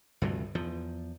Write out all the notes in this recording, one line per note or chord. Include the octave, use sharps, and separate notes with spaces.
D2 G2 C3 F3
E2 F3